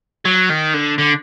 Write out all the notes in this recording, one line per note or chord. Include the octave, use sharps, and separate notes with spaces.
F#3
D#3
D3
D3